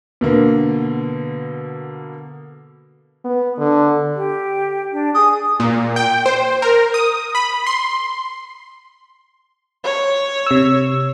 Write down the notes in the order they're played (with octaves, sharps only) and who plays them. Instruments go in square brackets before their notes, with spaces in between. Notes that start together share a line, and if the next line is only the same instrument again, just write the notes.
[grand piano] B2 D3 A#3
[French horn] B3
D3
[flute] G4
D4
[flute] G#4 [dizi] D#6
[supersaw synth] A#2
G5
C5
A#4
D#6
B5
C6
[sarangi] C#5
[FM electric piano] C3 E6